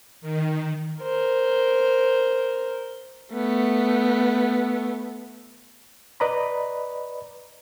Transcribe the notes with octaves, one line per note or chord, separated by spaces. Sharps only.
D#3
A#4 C5
A3 B3
B4 D5 D#5 A#5 B5